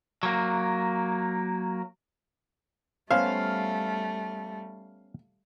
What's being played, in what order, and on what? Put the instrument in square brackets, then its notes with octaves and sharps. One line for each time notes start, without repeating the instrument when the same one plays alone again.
[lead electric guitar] F#3 A#3
[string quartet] G3 A3 [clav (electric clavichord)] B3 C#4 C5 [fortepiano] F5